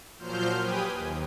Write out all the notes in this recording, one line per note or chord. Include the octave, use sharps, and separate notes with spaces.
A#2 F3 F#3 C5 F6 G6
G4 B4 G5 G#5 D#6
D#2